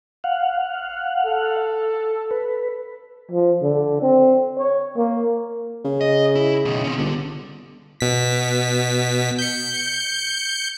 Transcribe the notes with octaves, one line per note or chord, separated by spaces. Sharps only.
F5 F#5
A4
B4
F3
D3
C4
C#5
A#3
C#3
D#5
E4
B2 D#3
C4 C#4
G1 D3
B2 B6
G6 C#7